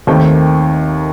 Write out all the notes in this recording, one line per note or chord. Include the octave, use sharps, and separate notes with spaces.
D#2 D#3 A3 C4 G5